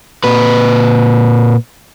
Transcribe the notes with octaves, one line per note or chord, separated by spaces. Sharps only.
A#2 B4